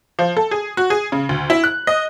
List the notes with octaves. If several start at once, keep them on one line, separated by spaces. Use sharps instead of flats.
F3
A4
G#4
F#4
G#4
C#3
D2
E4
F#6
D#5